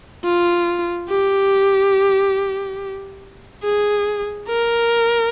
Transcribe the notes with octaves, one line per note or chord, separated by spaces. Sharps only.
F4
G4
G#4
A#4